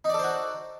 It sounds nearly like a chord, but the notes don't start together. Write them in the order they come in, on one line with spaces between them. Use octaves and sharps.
D#4 D5 A4 C5 F#4